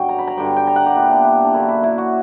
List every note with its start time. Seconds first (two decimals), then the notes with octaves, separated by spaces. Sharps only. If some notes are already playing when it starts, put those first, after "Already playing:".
Already playing: G2 D3 F#3 C#4 G5
0.09 A#5
0.19 B5
0.28 A#5
0.37 G2 D3 G3 G5
0.56 G5
0.67 A#5
0.76 F#5
0.86 G4
0.96 A#2 G3 B3 D4 E4
1.11 D4
1.24 E4
1.45 D4
1.54 F#2 D3 A#3 E4
1.68 E4
1.83 E4
1.98 F#4